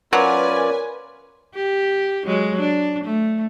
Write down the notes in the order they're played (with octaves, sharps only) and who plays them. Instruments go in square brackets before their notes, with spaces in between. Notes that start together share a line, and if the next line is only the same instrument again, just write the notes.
[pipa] F#3 [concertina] C#4 F4 D5 [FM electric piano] A#4 C#5 [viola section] B4 G#5
[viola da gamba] G4
F#3 G#3
D4
A3